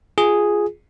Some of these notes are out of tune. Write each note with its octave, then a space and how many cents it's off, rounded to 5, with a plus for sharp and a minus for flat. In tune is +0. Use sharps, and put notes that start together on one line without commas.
F4 +0 G#4 +0